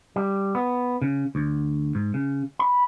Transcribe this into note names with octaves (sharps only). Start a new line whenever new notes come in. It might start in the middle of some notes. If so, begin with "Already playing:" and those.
G3
B3
C#3
D2
G#2
C#3
B5